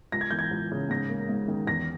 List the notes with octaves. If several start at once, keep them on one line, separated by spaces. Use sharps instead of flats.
C#2 A#6
G#6
E3 G6
G#6
C#2
C#3
G#2 A#6
A#3
G#2
D#3
E2 A#6